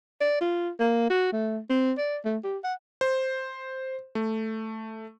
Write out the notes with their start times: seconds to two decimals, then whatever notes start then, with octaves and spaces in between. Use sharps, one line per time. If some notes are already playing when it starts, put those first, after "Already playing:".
0.21 D5
0.41 F4
0.80 A#3
1.10 F#4
1.32 A3
1.70 C4
1.98 D5
2.25 A3
2.44 G4
2.64 F#5
3.01 C5
4.15 A3